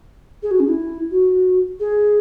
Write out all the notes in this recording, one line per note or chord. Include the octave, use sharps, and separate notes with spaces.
G#4
F#4
C#4
E4
F#4
G#4